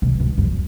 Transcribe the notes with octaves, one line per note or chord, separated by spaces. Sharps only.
B2
G#2
F#2